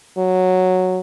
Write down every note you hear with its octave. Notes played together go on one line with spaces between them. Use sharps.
F#3